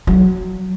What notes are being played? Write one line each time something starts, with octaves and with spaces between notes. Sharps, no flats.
F#3